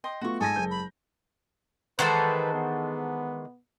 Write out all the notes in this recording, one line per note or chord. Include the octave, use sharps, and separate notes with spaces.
D#5 G5 C6
A3 B3 F4 F#4 C#6
G#2 A4 G#5 D#6 A#6
F#1 G#3 G6
B5
D#3 E3 G#3 A4 B4 C5 F#5
B3